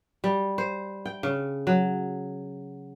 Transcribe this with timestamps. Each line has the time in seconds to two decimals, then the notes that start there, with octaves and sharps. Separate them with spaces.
0.24 G3
0.58 C5
1.06 G5
1.23 C#3
1.67 F#3